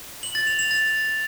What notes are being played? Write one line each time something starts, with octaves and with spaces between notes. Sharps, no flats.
F#7
A6
F7
F7
A6